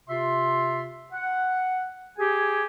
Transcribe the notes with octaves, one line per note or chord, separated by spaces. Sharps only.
C3 F4 E5 C6
F#5
G4 G#4 G#5